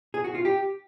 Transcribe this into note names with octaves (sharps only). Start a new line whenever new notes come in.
G#4
F#4
F4
G4